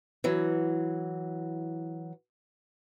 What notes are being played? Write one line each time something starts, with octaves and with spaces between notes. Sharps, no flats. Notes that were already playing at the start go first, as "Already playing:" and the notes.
E3 F#3